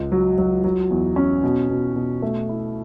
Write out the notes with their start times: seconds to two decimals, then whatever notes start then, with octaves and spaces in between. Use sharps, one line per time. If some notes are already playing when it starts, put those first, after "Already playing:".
Already playing: C#2
0.12 F#3
0.38 F#3
0.64 F#3
0.90 E2
1.16 C#4
1.43 B2
1.70 B2
1.96 B2
2.22 A3
2.49 E4